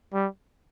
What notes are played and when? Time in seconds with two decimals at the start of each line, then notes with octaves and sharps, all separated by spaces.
0.13 G3